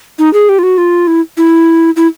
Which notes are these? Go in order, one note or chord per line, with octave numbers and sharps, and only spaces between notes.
D#4
G#4
G4
F4
F#4
F4
E4
E4
E4